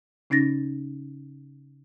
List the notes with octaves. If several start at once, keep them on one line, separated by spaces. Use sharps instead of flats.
C#3 C#4 D#4 A6 A#6